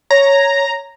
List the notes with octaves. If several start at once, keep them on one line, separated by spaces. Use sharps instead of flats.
C#5 A#5